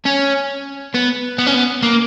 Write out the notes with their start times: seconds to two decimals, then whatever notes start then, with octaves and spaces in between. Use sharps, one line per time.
0.06 C#4
0.94 B3
1.39 B3
1.47 C#4
1.54 B3
1.83 A#3